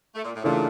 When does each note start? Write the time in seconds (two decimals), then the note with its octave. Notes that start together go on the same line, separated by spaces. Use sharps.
0.15 A3
0.24 A#2
0.35 A2
0.44 A#2 C#3 E3 A3 D4 F4